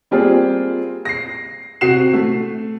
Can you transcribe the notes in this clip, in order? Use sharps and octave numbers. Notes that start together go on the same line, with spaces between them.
G3 A#3 C4 F4 G4 G#4
A#6 C7
C3 F#4 C7 E7
A3